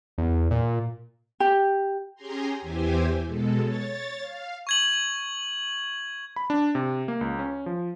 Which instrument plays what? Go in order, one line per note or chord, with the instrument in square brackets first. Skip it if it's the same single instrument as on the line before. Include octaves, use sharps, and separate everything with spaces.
[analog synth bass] E2
A#2
[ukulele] G4
[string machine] C#4 G4 G#4 G#5 A#5 C6
E2 E3 E4 G4 C5 G#5
B2 G#3 A4
C#5 A6
F5
[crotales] C#6 G#6 F#7
[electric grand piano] B5
D4
C3
A#3
C#2
C#4
F3